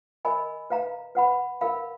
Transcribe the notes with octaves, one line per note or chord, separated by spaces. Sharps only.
A#4 D#5 G#5 B5
B4 F5 A#5
B4 F#5 B5
A#4 F5 B5